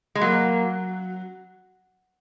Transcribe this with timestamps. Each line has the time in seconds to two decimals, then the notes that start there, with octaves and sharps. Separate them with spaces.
0.15 G#3
0.21 F#3 A#3